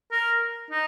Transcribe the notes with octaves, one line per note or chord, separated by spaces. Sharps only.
A#4
D#4